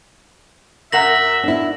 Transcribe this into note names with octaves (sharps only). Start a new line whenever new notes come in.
F#2 A#4 E5 F#5 A#6 F#7
D4 E4